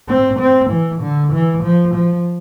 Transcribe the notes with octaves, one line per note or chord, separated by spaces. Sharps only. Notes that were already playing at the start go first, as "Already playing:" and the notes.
C4
C4
E3
D3
E3
F3
F3